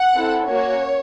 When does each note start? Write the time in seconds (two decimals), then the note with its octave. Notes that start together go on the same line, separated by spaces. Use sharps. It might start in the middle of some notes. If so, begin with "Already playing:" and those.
Already playing: F#5
0.16 C4 E4 A4
0.47 A#3 C#4 F#4 C#5